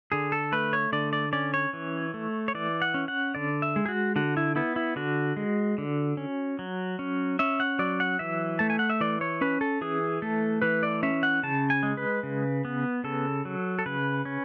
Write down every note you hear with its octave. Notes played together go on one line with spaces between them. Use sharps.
D3 G#4
A4
A3 B4
C#5
D3 D5
D5
C#4 D5
C#5
E3
A3
C#5
E3 D5
F#5
C#4
F#5
D3 D5
E5
G#3
G#4
F#4
D3 F#4
E4
B3 E4
E4
D3 F#4
G#3
D3
C#4
F#3
C#4
C#4 E5
F#5
F#3 D5
F#5
E3 E5
A3 A5
G#5
F#5
E5
E3 D5
C#5
C#4 B4
A4
E3 G#4
A3 A4
E3 B4
D5
C#4 E5
F#5
C#3 A5
G#5
G#3
B4
C#3
B3
C#3 A4
F#3
A4
C#3 B4
C#4